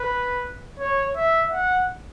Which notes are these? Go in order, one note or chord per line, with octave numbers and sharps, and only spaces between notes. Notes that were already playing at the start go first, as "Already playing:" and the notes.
Already playing: B4
C#5
E5
F#5